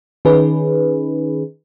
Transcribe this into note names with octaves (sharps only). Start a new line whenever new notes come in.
D#3 C#4 D#4 G#4 B4